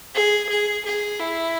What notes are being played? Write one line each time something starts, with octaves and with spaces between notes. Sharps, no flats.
G#4
G#4
G#4
E4